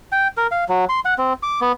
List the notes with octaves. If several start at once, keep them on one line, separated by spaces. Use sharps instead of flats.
G5
A#4
F5
F#3
C6
F#5
C4
D6
B3